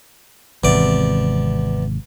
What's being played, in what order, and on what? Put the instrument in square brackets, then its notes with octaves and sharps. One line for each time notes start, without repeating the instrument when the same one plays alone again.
[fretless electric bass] G#1 C3 [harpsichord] E2 D5